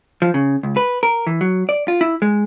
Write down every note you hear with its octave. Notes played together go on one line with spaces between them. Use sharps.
F3
C#3
C#2
B4
A#4
E3
F#3
D5
F4
E4
G#3